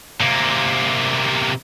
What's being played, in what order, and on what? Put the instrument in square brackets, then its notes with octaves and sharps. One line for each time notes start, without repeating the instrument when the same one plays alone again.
[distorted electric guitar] C3 A#3